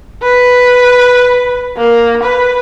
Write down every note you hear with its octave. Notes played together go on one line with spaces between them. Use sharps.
B4
A#3
B4